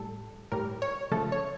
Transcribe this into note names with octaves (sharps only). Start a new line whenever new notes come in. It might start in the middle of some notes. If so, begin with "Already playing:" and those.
Already playing: A2 G3 A4
A2 G3 A#4
C#5
C#3 F3 A3 A4
C#5